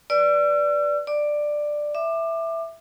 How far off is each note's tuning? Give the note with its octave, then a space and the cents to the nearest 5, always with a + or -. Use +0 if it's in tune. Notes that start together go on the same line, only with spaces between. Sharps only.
B4 +0 D5 -5 E6 +45
D5 +10 D6 +10
E5 +0 D6 +25